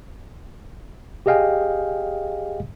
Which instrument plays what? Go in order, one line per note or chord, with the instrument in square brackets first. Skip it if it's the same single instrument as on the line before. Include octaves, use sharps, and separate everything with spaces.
[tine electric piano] G4 G#4 D#5 F5 G5 G#5